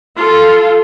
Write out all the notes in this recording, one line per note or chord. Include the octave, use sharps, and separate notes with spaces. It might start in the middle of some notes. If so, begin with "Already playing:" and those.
F4 A4